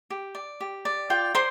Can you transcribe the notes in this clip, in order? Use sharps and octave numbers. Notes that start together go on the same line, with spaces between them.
G4
D5
G4
D5
F4 G5
C5 D5 C6